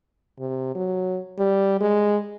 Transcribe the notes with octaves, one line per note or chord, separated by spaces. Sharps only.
C3
F#3
G3
G#3